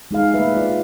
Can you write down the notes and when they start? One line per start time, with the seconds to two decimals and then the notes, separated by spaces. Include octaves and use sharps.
0.11 G#3 D#4 G#4 F5
0.34 A3 A#3 B4 E5
0.54 F4 D5